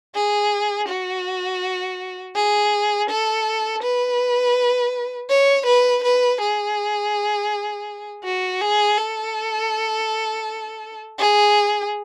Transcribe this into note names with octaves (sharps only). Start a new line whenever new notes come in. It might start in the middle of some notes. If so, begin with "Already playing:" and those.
G#4
F#4
G#4
A4
B4
C#5
B4
B4
G#4
F#4
G#4
A4
G#4